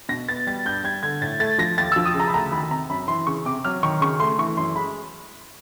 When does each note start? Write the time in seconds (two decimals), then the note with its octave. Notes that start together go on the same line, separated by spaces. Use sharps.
0.09 B2 A#6
0.28 B3 A6
0.47 G3 A6
0.65 G2 G6
0.84 G3 G#6
1.03 D3 G#6
1.21 A2 A6
1.40 A3 A6
1.58 F3 A#6
1.78 D#2 A6
1.92 E6
1.96 F3
2.06 D#6
2.14 C#3
2.20 A#5
2.28 B5
2.34 D2 A#5
2.52 D#3 B5
2.71 C3 A#5
2.89 F#2 B5
3.08 E3 C6
3.27 C#3 C#6
3.45 C3 D6
3.65 F#3 F6
3.83 D#3 C#6
4.01 C#3 C#6
4.20 A3 C6
4.38 E3 C#6
4.57 F#2 C6
4.76 G#3 B5